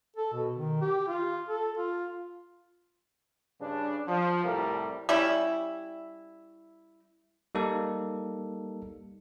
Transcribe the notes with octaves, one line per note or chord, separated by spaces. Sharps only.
A4
B2
D#3
G4
F4
A4
F4
G2 C#3 D4
F3
C2 A2 G3 A4 A#4
G3 C#4 E4
G3 A#3 D#4 A4